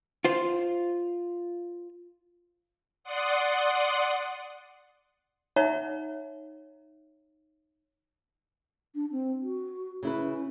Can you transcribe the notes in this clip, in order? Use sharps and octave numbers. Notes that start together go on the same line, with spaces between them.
F4 C5
D5 F#5 C6 D#6
D#4 C#5 E5 F#5 A#5
D4
C4
F#4
C#3 E4 B4
C#4